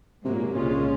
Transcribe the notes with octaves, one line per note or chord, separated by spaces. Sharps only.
G#2 C3 F#3 A#3
A#2
C3
C2 A#2 C#3 G#3 C#4 F4
C#3